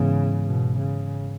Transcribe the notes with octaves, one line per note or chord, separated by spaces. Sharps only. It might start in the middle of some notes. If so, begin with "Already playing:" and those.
Already playing: G#2 C#3 E3 B3
B2
C#3